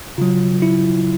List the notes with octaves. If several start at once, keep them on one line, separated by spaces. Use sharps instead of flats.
C#3 F#3 F4
E4